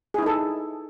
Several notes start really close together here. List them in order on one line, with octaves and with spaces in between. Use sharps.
G#4 E4 D#4 A4